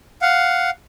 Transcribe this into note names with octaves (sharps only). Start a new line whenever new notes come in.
F5 F#5